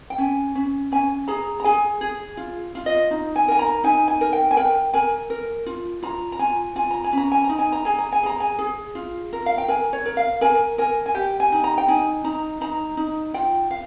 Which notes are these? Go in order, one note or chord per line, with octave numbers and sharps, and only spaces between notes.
G5
C#4 G#5
C#4
C#4 G#5
G#4 A#5
A#5
G#4 G#5
G#4
F4
F4
D#5
D#4
G#5
A#4 G#5
A#5
D#4 G#5
G#5
A#4
G5
G#5
A#4 G5
A#4 G#5
A#4
F4
F4 A#5
A#5
F4 G#5
F4 G#5
A#5
G#5
C#4 A#5
G#5
D#4 A#5
G#5
A#5
G#4 G#5
A#5
G#5
G#4 A#5
G#5
G#4
F4
A#4
F5
G5
A#4 G#5
C#5
A#4
F5
A#4 G#5
A#4 G#5
G#5
G4 G5
G#5
D#4
A#5
G5
D#4 G#5
D#4 A#5
D#4 A#5
D#4
F4 G5
F5